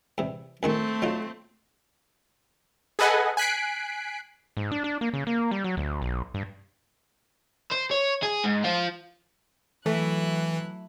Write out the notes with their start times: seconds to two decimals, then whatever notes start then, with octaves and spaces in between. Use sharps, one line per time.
0.18 E2 C3
0.63 C#2 D#3 A3 C4 C#6
1.02 F#3 D#4 F4
2.99 G#4 A4 B4 D#5 F#5 G#5
3.37 G#5 F#6 B6 C7 D7
4.57 G#2
4.72 D4
4.84 D4
5.01 A#3
5.14 C#3
5.27 A#3
5.51 G3
5.64 F#3
5.77 D2
6.02 B1
6.34 G2
7.72 C5
7.91 C#5
8.23 G#4
8.44 G#2
8.64 F3 F4
9.86 E3 F#3 A3 E4 F#6